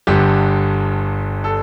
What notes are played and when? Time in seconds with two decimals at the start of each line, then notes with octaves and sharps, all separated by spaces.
0.07 G1 G2 D3 G4
1.44 A4